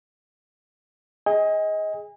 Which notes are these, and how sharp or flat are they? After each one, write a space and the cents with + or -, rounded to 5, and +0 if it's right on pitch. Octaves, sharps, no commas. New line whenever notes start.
G#4 +0 D#5 +20 G#5 -35